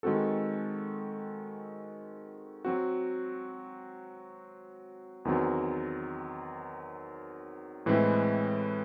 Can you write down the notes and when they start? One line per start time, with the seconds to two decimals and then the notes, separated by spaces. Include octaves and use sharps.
0.03 D#3 G#3 C4 F#4 A4
2.65 F#3 C4 F#4
5.25 E2 D#3 F#3 C4
7.86 A2 E3 G#3 C4 E4